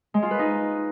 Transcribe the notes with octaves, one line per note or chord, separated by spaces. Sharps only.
G#3
F4
B4
D#4